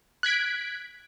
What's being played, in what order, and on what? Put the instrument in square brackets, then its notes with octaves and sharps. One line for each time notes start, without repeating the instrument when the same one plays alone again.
[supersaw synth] F#6 G#6 B6 D7